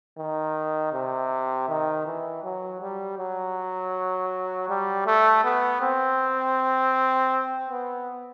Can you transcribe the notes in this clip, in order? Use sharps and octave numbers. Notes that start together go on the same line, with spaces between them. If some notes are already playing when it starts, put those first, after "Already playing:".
D#3
C3
D#3
E3
F#3
G3
F#3
G3
A3
B3
C4
B3